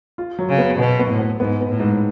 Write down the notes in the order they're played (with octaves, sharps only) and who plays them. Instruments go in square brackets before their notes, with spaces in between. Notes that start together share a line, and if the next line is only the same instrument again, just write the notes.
[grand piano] F4
F#3
[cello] C#3
[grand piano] B3
[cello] B2 [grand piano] B3
[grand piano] B3
[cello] A2
[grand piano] B3
[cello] G#2 [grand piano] B3
[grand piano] B3
[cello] A2
[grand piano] G#2